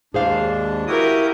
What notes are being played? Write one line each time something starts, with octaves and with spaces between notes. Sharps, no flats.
D#2 G#2 D4 G#4 C5 F5
E4 F#4 G4 A#4 D#6